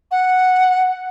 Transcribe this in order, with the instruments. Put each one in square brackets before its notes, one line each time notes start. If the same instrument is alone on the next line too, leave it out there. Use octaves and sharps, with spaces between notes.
[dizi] F#5